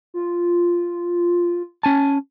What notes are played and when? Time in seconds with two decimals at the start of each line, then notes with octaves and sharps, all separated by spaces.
0.14 F4
1.83 C#4 G#5 A5